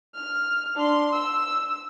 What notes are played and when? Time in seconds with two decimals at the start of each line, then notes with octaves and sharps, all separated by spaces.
0.15 F6
0.75 D4 C6
1.13 E6